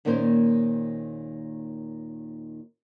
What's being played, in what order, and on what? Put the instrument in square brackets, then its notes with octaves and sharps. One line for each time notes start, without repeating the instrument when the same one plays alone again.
[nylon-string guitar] D#2 A#2 D#3 A#3 C#4 C5